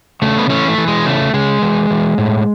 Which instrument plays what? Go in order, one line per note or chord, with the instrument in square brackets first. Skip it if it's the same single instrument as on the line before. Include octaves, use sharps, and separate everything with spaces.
[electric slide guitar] C#3 A3
B3
E3 A3 C#4
A3
E3
G#3
C#3 A3
C#3 G#3
E3
E3
A2